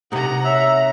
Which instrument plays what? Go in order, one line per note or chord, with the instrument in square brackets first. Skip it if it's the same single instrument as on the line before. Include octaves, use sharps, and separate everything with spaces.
[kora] C3 D#4 [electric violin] F#5 A#5
[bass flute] C#5 [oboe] E5